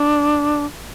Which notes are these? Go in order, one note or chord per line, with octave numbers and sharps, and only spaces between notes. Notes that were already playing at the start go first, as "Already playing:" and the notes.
Already playing: D4